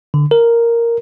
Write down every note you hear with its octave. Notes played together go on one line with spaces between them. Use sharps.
D3
A#4